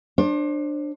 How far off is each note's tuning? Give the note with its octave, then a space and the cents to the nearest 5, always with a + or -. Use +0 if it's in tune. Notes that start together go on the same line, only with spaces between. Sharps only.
D4 +15 C5 +35